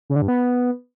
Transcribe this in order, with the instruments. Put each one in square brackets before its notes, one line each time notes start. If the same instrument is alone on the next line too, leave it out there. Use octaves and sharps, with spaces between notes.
[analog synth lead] C#3
D3
G2
B3